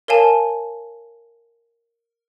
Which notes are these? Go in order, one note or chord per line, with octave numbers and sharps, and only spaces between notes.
A#4 C#5 F5 G#5 A5